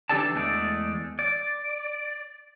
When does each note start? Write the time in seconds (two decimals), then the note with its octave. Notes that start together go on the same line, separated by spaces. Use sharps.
0.09 E3 D4 G4 A4 D5 A5
0.35 E2 G#3 A3 D#4 D5
1.19 D5